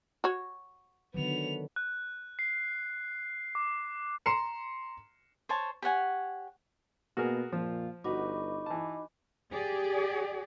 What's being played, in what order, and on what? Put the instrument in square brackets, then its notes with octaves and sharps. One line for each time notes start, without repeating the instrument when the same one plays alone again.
[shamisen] F#4 C#5
[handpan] D3 D#3 F#3 [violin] B3 F7
[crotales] F#6
C7
D6
[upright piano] A#5 C6 C7 C#7 E7
[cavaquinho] C5 C#5 A5
G4 C#5 F#5 G#5
[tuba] B2 [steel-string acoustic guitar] A#3 B3 [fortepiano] F#4 G#4 A#4
[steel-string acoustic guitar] F2 F4 [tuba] A#2 [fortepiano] F3
[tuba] G1 [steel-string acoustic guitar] D#4 F#4 B4 [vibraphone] D#5 B5 D6
[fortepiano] E3 A5
[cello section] G4 G#4 D5